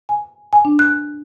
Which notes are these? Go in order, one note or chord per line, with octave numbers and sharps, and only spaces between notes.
G#5
G#5
D4
F#6